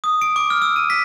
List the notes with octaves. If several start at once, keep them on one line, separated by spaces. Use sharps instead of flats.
D#6
D7
D6
F6
E6
D#7
B6